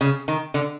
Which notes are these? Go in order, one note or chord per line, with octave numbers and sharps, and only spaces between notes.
C#3
D#3
D3